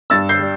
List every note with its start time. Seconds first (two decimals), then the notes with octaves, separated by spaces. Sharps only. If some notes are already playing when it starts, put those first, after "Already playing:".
0.10 G2 E6 A6
0.29 G6 C7
0.39 G3